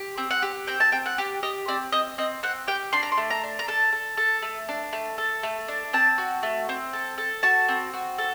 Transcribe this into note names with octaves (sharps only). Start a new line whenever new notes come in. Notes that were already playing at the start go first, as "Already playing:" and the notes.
Already playing: G4
C4
F#5
G4
C4 G5
A5
C4 G5
F#5
G4
G4 D#5
C4 D5
C4 D#5
C4 D#5
C4 F#5
G4 G5
D4 C6
A#5
C6
A3
A#5
D4
A#5
A4 A5
A4
A4
A3
D4
A3
A4
A3
D4
C4 A5
F#4
A3
C4
A4
A4
F#4 A5
C4
F#4
A4